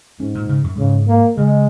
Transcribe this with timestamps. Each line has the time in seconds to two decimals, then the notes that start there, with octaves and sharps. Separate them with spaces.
0.20 G#2 C#4
0.35 A#2
0.49 C#3
0.64 F#2
0.78 G#2 C#3
1.07 A#3
1.37 C#3 G#3